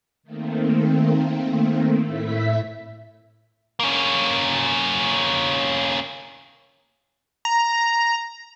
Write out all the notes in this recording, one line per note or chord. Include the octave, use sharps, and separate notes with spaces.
D#3 A3 A#3 C4
A2 A3 E4 E5 B6
A#3 C#4
A#5